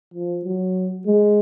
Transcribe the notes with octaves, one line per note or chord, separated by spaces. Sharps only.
F3
F#3
G#3